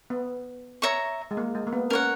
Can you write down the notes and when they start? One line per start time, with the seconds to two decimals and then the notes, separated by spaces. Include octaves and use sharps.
0.10 B3
0.82 C#5 E5 A#5 C#6
1.31 G#3
1.37 A#3
1.55 G#3
1.67 A#3
1.73 B3
1.90 C#4 A#4 C#5 F#5